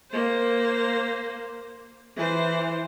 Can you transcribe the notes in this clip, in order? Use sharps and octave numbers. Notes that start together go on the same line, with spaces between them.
A#3 C5
E3 C5